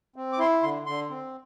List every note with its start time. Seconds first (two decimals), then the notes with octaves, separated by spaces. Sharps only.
0.16 C4
0.33 D6
0.39 E4 C6
0.62 D3 C6
0.86 D3 C6
1.10 C4